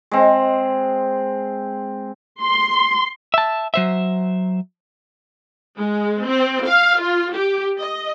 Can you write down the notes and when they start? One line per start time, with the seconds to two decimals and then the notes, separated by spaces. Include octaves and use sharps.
0.11 G#3 C4
2.43 C6
3.34 E5 A5
3.74 F#3 C5 E5
5.78 G#3
6.25 C4
6.64 F5
6.99 F4
7.33 G4
7.79 D#5